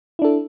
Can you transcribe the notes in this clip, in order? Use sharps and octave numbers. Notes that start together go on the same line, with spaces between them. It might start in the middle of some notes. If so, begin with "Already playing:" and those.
D4 E4 A4